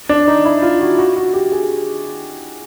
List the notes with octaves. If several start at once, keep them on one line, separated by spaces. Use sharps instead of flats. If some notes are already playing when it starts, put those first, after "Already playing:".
D4
D#4
E4
F4
F#4
F#4
F#4
G4
G#4